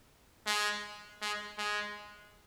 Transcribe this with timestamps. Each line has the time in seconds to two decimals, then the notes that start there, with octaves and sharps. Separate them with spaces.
0.47 G#3
1.21 G#3
1.58 G#3